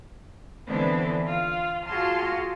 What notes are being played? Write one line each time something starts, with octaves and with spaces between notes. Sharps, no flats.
D3 E3 B3 C4 D4
F4 F5
F4 F#4 G#4 A5 C6 F6